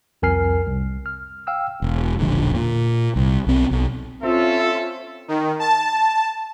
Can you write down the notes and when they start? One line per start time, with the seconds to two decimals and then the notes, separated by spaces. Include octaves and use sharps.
0.22 C2 F2 A#4 G#5 F6 C7
0.67 C2
1.06 F6
1.47 F5 G5 E6 F6
1.82 E1
2.19 E1 A#1 D3
2.55 A#2
3.16 C2
3.47 B1 C4
3.71 B1
4.23 C4 C#4 F4 A4 E5
5.28 D#3
5.59 A5